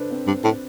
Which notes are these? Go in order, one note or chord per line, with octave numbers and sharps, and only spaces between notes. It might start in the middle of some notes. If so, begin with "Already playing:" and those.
Already playing: D4 A4 B4 C5
C4
G2
A2